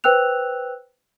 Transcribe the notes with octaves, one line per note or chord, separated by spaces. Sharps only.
B4 C5 G5 E6 F#6 F7